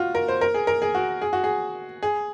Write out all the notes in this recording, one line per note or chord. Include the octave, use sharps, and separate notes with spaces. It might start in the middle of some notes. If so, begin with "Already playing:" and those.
Already playing: F4 F#4
A#4
C5
A#4
G#4
A#4
G#4
F#4
G#4
F#4
G#4
G#4